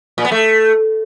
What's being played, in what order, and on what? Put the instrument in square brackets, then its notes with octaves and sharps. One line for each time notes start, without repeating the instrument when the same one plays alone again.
[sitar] A#2
B3
A3